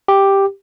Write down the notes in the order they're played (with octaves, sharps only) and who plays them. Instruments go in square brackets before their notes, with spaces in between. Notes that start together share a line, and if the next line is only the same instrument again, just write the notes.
[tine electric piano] G4